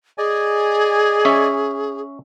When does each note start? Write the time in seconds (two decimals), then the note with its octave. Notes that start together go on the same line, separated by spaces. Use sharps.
0.18 G#4 D5 D#5 G#5
1.25 C#4 E5